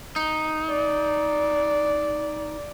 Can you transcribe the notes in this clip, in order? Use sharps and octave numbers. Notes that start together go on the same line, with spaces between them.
D#4
D5